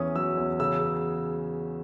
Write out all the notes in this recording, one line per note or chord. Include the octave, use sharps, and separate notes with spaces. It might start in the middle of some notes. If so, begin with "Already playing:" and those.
Already playing: E2 E3 C#4 D#6
F#3 E6
E2
C#3 E6